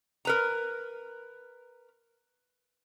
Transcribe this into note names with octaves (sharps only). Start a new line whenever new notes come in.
A#4 B4 A#5